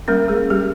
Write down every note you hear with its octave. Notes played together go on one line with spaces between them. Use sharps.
G3 A#3 C#4 A#4
G#3 G#4
G3 G4